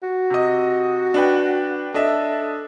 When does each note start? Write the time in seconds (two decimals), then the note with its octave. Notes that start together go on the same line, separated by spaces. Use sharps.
0.03 F#4
0.30 C3 D#5
1.14 D4 B4 G5
1.94 D4 A4 D#5 E5